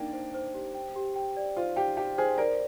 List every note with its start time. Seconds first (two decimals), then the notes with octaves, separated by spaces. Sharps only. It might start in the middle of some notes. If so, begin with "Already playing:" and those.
Already playing: A#3 D4 D#4 G5
0.13 C5
0.34 C5
0.54 G4
0.75 G5
0.96 G4
1.16 G5
1.37 D5
1.57 F4 C5
1.76 G4 G5
1.97 G4 G5
2.18 G#4 C5
2.38 A#4 D5